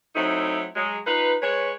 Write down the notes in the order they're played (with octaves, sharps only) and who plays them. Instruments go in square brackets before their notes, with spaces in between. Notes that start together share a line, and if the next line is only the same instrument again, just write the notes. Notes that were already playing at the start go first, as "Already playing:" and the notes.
[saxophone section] F#3 A3 C4 D#4 E4
F#3 G#3
D#4 F4 B4
G#3 B4 C#5